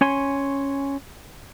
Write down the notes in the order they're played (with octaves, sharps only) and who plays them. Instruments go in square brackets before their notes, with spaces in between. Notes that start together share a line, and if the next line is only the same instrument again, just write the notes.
[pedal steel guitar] C#4 C#5 G#5 C6